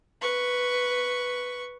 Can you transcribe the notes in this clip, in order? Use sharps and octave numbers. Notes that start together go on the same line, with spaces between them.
B4 C#6